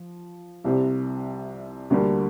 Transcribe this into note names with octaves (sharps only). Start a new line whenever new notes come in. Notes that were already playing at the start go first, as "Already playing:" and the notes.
Already playing: F3
C2 C3 G3
D2 D3 G3 A#3